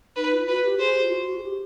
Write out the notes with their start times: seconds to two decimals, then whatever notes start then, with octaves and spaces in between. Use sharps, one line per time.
0.16 D#4 B4
0.32 F4
0.48 F#4 B4
0.64 G4
0.79 G#4 C5
0.95 G4
1.03 F4
1.11 F#4
1.27 F#4
1.38 G#4
1.43 G4